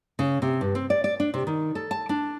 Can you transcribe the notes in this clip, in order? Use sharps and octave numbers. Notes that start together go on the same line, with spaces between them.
C#3
C3
G2
C4
D5
D5
D4
C3
D#3
A4
A5
D4